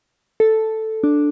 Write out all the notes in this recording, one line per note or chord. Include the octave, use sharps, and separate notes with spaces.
A4
D4